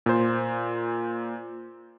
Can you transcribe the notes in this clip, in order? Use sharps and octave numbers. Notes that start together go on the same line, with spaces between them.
A#2 C5